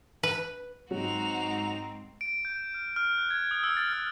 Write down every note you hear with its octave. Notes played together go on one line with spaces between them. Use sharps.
B4
G#2 F#3 C4 D#4 F#4 F7
D7
G6
F6
F6
F#6
G#6
D#6
E6
A6
F6